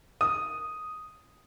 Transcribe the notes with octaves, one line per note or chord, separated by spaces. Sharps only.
D#6